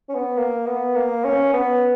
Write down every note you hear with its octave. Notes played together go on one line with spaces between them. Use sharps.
C#4
B3
A#3
B3
A#3
C#4
B3